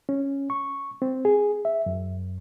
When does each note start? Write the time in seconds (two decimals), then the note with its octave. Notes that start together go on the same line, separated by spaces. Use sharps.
0.09 C#4
0.50 C#6
1.02 C4
1.25 G#4
1.65 E5
1.86 F#2